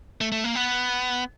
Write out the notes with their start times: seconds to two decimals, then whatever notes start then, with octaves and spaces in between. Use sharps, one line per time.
0.21 A3
0.32 A3
0.44 A#3
0.55 B3